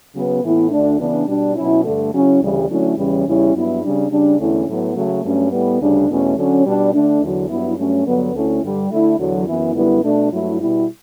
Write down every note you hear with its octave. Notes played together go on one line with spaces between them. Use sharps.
C#3 F#3 B3
A2 E3 B3 E4
D2 D3 A3 D4
C#3 E3 B3 D4
B2 G3 D4
B2 F#3 C#4 E4
G2 D3 A3
C#3 F#3 C#4 E4
D2 C#3 E3 G3
D3 F#3 A3 C#4 E4
E2 C#3 E3 G3 C#4
E2 C#3 G3 C#4 E4
G2 F#3 B3 E4
C#3 G3 D4
C#3 G3 D4
E2 D3 A3 C#4 E4
A2 F#3 B3
C#3 F#3 A3
G2 F#3 A3 C#4
A2 G3 B3
D2 C#3 G3 D4
E2 B2 A3 C#4
D3 F#3 C#4
B2 G3 D4
D3 A3 D4
E2 D3 F#3
G2 F#3 B3 E4
G2 F#3 A3 C#4
G2 D3 F#3 B3
D2 D3 A3 C#4 E4
G2 D3 G3
D3 A3 E4
E2 D3 F#3
F#2 E3 B3 E4
F#2 D3 G3 B3 E4
B2 A3 D4
G2 F#3 A3 E4
B2 G3 B3 E4